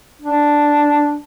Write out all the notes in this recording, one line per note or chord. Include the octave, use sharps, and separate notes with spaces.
D4